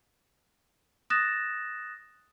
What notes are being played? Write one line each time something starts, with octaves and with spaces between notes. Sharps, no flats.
D#6 F#6 A6 A#6 E7